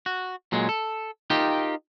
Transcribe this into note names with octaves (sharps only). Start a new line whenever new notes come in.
F#4
A#2 F#3 G#3
A4
D#4 F4 G4 A#4 G5